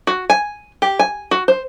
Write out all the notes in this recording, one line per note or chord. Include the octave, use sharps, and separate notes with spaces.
F#4
G#5
G4
G#5
F#4
C5